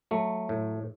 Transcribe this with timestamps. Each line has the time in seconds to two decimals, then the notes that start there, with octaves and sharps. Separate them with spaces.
0.11 F#3 A3
0.49 A2